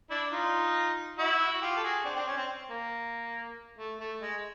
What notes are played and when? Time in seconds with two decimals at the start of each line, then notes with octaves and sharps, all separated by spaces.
0.10 D4 E4
0.32 D#4 F4
1.18 E4 F#4
1.53 F#4
1.62 F4 G4
1.77 A4
1.84 F#4 G#4
2.05 C4 D4
2.16 C4 D4
2.28 C#4
2.37 C4
2.70 A#3
3.79 A3
4.00 A3
4.21 G#3